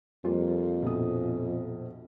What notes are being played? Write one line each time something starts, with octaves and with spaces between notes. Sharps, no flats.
F2 G3 A#3 F4
A#1 B2 D#6